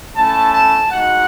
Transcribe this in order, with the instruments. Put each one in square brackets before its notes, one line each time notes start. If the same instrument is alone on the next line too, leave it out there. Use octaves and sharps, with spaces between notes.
[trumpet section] A3 C#4 E4 A5
A5
G#3 D#4 F#4 F#5